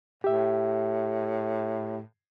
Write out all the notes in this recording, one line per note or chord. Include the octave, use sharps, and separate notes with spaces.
A2 G4 E5